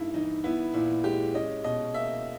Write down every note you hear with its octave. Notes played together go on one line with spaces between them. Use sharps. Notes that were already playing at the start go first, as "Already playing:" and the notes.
Already playing: G2 A#3 D#4 E4
E3 D#4
B3 E4
A#2 E4
G#3 G4
C#4 D#5
B2 D#5
A#3 E5